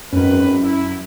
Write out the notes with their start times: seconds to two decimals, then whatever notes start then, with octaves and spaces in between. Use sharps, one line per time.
0.13 G#1 F#2 D#3 C#4 B4
0.62 E4